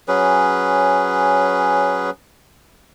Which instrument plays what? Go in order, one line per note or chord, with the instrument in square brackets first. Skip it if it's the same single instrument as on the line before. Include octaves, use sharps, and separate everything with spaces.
[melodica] F#3 C#4 G#4 B4